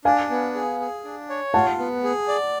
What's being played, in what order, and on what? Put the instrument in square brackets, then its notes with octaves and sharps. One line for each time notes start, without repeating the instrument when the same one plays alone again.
[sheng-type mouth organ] D4 [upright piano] F5 G#5
[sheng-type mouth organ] B3
G#4
G#4
D4
C#5
[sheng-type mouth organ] F4 [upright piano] F#5 A5
[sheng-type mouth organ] B3
G#4
D5